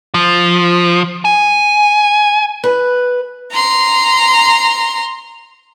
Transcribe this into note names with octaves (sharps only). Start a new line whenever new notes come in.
F3
G#5
B4
A#5 C6